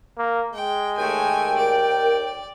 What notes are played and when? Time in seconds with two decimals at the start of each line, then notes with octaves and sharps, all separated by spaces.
0.18 A#3
0.54 G#3 G5
0.98 D#2 A3 G5 G#5
1.58 A#4 D5